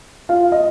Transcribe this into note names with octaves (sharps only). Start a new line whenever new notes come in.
F4 F5
D#5